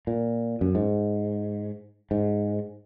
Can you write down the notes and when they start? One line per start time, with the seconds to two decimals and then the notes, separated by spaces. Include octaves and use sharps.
0.07 A#2
0.61 F#2
0.75 G#2
2.11 G#2